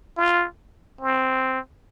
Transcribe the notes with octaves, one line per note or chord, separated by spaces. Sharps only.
F4
C4